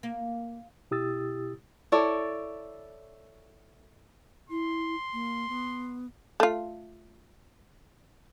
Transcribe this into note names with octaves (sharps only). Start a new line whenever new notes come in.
A#3
B2 E4 G4 D#6 E6 A6
E4 A4 C#5 D5
E4 C6
A#3
B3
A3 F4